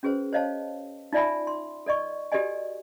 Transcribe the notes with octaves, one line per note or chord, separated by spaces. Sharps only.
C#4 F#4 G#4 B4 C5
C5 C#5 D#5 F5 A5
D#4 F4 D5 E5 G#5 B5
C6
A4 D5 D#5 C#6
F#4 G4 A4 D5 D#5 G#5